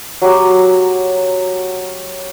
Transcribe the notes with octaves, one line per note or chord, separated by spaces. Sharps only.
F#3 G4